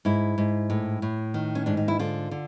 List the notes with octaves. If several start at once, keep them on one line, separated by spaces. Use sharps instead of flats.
G#2 E4
G#2
A2
A2
D#3
C#4
G#2 D4
D#4
E4
D3 F4
D3